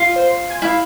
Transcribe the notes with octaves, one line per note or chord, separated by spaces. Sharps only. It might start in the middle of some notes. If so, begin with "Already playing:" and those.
Already playing: F4
C5
G#5
E4 F5